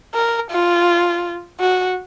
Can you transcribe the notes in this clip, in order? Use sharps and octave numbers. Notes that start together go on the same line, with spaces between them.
A#4
F4
F#4